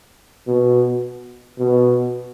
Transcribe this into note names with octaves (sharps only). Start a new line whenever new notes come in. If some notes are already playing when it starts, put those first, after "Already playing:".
B2
B2